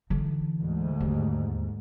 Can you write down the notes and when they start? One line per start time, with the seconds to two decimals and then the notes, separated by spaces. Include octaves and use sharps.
0.10 D3 E3
0.59 D2 G#2
1.00 D#2